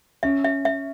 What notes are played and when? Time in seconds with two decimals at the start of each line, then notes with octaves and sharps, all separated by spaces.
0.23 C#4 E5
0.44 E5
0.65 E5